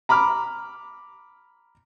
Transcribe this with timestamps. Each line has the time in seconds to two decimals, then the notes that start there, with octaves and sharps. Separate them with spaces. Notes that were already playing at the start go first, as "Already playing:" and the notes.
0.09 A#5 B5 D6 F6